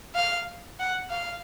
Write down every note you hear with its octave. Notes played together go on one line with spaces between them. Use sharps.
F5
F#5
F5